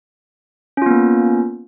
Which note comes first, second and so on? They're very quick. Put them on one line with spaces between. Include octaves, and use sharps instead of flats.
C#4 F4 B3 A#3